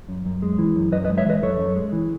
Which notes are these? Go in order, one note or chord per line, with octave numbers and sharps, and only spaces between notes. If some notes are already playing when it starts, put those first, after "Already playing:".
F#2
F#2
G#3
E3
F#2
F#2 B4 D#5
B4 D#5
G#3
C#5 E5
E3 B4 D#5
F#2 A4 C#5
F#2
G#3
E3